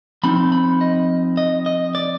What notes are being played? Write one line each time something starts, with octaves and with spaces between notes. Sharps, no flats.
F3 C4 D#4 B5
B5
D#5
D#5
D#5
D5